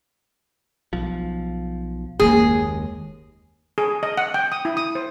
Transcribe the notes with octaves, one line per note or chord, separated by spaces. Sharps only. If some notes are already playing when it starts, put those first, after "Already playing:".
B1 F3
F#1 D#2 G#3 A#3 C#4 G#4
G#4
D#5
F#5
G5
D#6
E4
D#6
C5